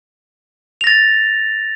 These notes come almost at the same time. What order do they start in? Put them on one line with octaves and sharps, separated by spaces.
F7 A#6 A6